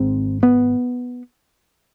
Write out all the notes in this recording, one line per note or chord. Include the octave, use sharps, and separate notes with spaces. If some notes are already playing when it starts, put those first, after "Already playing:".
Already playing: G#1 G#2 C4
B3